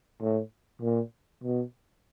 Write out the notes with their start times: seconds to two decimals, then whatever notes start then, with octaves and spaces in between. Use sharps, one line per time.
0.21 A2
0.82 A#2
1.44 B2